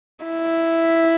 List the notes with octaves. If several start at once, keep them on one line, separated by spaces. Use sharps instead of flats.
E4